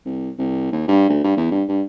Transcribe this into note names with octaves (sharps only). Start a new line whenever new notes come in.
C2
C2
D#2
G2
D2
G2
E2
G2
G2